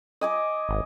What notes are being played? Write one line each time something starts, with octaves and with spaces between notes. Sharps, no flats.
D#5 G#5 D6
G#1